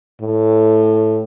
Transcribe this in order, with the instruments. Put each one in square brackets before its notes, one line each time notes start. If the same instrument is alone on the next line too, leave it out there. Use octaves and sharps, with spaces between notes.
[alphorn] A2